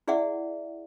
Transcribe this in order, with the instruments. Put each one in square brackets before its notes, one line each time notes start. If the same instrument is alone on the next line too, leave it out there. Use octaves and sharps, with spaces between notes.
[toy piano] E4 G#4 D5 E5 F#5